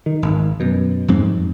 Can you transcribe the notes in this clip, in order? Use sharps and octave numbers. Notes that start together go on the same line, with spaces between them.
D#3
G#1
F#2 B2
F2 G#2 C4